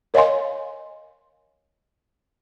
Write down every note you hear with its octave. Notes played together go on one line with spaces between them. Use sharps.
A#4 C#5 D#5 F5 G#5 C6